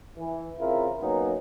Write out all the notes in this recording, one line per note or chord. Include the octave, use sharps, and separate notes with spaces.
E3
C#3 C4 E4 F4 A#4
F#3 A#3 B3 C#4 D#4